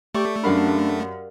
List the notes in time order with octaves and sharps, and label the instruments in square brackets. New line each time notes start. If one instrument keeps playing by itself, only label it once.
[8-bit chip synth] A3 [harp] G4 D5 C#6
[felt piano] F#2 B5 [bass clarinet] D4 [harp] A#4 F5 F#5